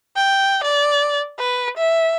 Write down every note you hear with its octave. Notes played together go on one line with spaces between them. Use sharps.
G5
D5
B4
E5